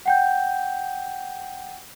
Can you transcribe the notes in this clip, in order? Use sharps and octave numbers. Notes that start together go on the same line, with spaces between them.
F#5 G5 G6